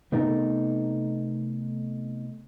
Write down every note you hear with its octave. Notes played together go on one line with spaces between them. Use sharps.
C3 A3 B3 D#4 A4 A#4